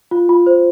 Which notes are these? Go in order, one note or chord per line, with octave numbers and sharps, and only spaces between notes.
F4
F4
C5